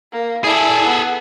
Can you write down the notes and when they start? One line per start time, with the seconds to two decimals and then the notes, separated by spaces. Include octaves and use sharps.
0.12 A#3
0.44 E4 G#4 A4 D5
0.85 B3